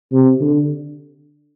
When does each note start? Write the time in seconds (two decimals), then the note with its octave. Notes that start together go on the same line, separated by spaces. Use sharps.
0.12 C3
0.41 D3